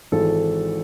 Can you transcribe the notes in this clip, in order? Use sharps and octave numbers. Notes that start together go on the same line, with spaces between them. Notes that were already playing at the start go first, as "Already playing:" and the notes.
G#1 G#2 E3 A4